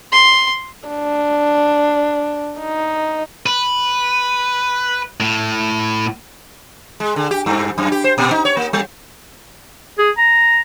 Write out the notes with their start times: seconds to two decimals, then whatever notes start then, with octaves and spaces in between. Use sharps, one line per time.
0.12 C6
0.89 D4
2.61 D#4
3.46 B4
5.20 A2
7.00 G#3
7.16 D3
7.31 G4
7.46 G2
7.78 F#2
7.92 G4
8.04 C5
8.18 A#2
8.31 D#4
8.45 C#5
8.57 A#3
8.73 G3
9.98 G#4
10.18 A#5